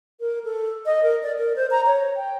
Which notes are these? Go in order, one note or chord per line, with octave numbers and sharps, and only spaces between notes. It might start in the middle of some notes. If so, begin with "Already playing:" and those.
A#4
A4
D#5
A#4
D5
A#4
C5
A#5
C#5
G5